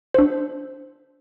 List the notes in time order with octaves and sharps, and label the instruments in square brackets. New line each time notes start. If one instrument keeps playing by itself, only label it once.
[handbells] D4 C5